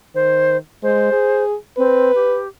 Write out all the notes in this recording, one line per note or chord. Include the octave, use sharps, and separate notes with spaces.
D#3 C5
G#3 C5
G#4
C4 B4
G4